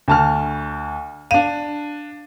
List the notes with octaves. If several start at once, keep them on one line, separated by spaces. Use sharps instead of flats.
D2 A5 F6
D4 F5 D#7